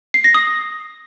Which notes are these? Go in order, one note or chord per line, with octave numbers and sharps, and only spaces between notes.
C7
A#6
D#6